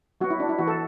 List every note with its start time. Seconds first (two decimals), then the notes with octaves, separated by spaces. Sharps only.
0.21 F#3 B3 F#4
0.30 E4
0.40 D4
0.49 E4
0.58 E3 B3 F#4
0.67 A4